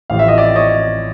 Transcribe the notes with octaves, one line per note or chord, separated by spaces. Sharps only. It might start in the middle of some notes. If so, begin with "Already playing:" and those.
A1 A2 F3 A3 F5
E5
D#5
D5 E5
C#5 D#5